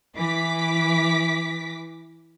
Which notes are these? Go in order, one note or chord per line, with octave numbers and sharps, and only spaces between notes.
E3 D6 B6